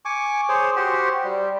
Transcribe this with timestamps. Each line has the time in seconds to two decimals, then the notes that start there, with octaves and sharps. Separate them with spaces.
0.05 G#5 C#6 D6
0.49 G#4 C5 C#5
0.76 F#4 G4 C5
1.24 G3